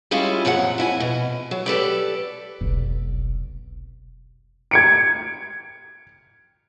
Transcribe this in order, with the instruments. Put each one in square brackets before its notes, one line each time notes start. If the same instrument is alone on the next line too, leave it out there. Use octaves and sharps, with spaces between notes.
[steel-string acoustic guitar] G3 G#3 C#4 E4 F4
F#2 A#2 F3 G#4 F#5
F2 E4 G#5
B2
F#3
G4 A4 B4 D5
[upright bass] F1 B1
[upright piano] G#6 C#7 D7